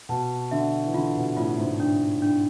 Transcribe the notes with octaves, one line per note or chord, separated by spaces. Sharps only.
B2 A5
D3 E5
E3
D3 F4
B2
A2 F4
G#2
D4
D4